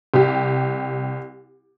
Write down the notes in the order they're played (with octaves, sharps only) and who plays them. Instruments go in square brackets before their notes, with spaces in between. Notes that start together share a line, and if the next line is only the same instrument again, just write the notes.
[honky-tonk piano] C2 G4